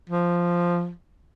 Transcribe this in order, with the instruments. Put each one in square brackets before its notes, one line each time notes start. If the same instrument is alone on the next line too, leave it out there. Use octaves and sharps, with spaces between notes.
[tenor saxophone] F3